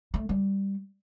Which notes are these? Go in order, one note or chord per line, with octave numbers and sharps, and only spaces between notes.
A3
G3